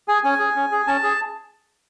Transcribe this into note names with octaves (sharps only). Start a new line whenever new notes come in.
G#4 G#5
C#4 G#5
G#4
C#4
G#4
C#4 A5
G#4